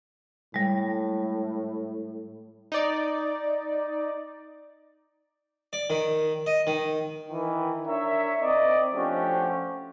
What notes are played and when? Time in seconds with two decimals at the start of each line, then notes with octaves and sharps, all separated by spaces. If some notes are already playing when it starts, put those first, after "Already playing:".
0.54 A2 G3 G#3
2.72 D#4 D5
5.73 D5
5.90 D#3
6.46 D#5
6.67 D#3
7.30 D#3 E3
7.86 D4 A#4 C#5 E5
8.41 C4 D#4 D5 D#5
8.94 F3 A3 C#4 D4 F#4 G4